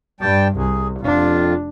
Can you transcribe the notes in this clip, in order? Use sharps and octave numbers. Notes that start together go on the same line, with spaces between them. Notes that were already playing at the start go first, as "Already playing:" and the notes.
G2 G3 G5 A5
C2 G#4
F1 F2 D4 F4